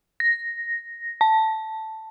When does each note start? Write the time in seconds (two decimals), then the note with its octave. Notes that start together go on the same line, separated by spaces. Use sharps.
0.20 A#6
1.21 A5